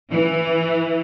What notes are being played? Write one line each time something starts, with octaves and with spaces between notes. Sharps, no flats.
E3